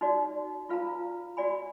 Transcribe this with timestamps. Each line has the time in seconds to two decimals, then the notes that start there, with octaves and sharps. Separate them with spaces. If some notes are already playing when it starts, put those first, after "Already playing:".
0.01 D#4 F#4 D5
0.69 F4 B4 F5 A#5
1.37 F#4 D5 G#5 B5